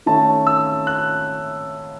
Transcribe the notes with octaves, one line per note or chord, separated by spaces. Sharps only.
D#3 A3 C#4 A5
E6
F#6